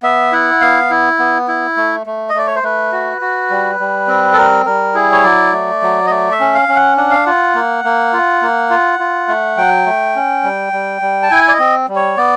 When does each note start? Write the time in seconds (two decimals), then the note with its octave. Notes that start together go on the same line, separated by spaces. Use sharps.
0.03 B3 E5
0.32 E4 F#5
0.61 B3 F5
0.91 E4
1.19 B3
1.48 E4
1.77 A3
2.07 A3
2.29 D#5
2.34 A3 D5
2.47 C#5
2.55 C5
2.63 A3 B4
2.92 F#4
3.22 F#4
3.50 G3
3.80 G3
4.08 C4
4.33 A4
4.37 G3 A#4
4.66 G3 A#4
4.94 E4 G#4
5.12 C#5
5.24 F#3 D5
5.52 A3
5.82 F#3
6.06 D#5
6.10 A3 D5
6.32 E5
6.40 C#4
6.55 F5
6.68 C#4
6.76 F#5
6.97 D4 F#5
7.11 F5
7.25 F4 F#5
7.55 A#3
7.84 A#3
8.13 F4
8.42 A#3
8.70 F4
8.99 F4
9.28 A3
9.57 F#3 G5
9.86 A3
10.16 C#4
10.44 G3
10.73 G3
11.02 G3
11.23 A5
11.31 E4 G#5
11.48 D5
11.52 D#5
11.59 C4
11.89 G3
11.96 C#5
12.17 B3 D5